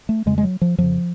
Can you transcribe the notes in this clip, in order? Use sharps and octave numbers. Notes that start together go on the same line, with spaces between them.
A3
F2 C#3 G#3
G#3
F#3
F3
F2 C#3 F3